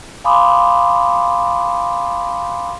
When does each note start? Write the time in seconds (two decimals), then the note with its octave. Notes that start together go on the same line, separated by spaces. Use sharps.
0.24 F5 G#5 B5 C6 D6 D#6